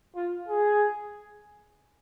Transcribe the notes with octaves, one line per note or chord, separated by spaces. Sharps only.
F4
G#4